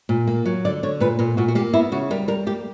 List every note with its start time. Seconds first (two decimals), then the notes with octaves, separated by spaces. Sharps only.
0.09 A#2
0.27 A#3
0.45 F#3
0.65 D3 D5
0.83 D3 C#5
1.00 A#2 B4
1.19 A#2 A#4
1.37 A#2 F#4
1.48 F#4
1.55 A#3 G4
1.73 B3 E4
1.92 C#3 F#4
2.11 G3 A#4
2.28 G3 A#4
2.47 A#3 G4